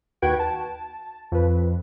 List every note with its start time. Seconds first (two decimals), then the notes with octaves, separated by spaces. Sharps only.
0.22 D#2 F#4 B4 G5 G#6 D7
0.39 A5
1.32 F2 B4